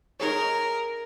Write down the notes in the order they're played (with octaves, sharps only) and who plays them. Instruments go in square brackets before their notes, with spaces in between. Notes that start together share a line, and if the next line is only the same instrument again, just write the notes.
[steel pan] D#4 G#4 C#5 [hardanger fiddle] A#4